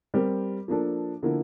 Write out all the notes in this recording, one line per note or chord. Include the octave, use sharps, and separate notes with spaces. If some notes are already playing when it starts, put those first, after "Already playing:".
G3 C4 G4 A#4
F3 A#3 D4 A4
D3 F3 A#3 E4